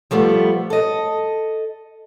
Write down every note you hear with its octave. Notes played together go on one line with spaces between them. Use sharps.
F3 G3 A3 B3
A4 D#5